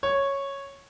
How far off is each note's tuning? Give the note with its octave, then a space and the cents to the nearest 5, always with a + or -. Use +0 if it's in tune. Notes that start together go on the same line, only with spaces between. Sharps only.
C#5 -5